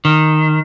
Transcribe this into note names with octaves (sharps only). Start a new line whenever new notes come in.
D#3